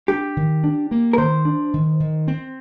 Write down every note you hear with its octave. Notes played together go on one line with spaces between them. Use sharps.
D4 G4
D#3
D4
A#3
A#4
D#3 C5
D4
D#3
D#3
C4